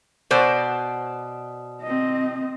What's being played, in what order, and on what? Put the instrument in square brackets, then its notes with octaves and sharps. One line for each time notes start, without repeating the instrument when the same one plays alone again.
[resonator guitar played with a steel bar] B2 C5 D5
[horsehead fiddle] C4 D#5